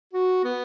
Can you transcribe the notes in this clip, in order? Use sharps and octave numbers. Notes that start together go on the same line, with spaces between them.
F#4
B3